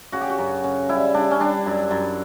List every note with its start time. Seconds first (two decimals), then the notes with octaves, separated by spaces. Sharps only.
0.12 C#3 F#4
0.21 G4
0.30 F#4
0.38 F#2
0.64 C#3
0.89 G3 E4
1.14 G3 D4
1.31 C#4
1.40 G3 D4
1.66 F#2
1.91 F#2